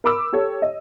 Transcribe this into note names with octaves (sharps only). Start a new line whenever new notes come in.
A#4 B5 D6 E6
G4 A4 C#5
D#5